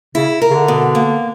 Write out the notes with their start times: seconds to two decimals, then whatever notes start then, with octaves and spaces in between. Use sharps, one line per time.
0.15 C#3 E4
0.42 A#4
0.51 C#3
0.55 D3
0.68 B2
0.95 A#3